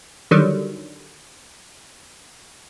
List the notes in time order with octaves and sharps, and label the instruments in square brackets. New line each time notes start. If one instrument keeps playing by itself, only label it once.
[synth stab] D3 D#3 F#3 G3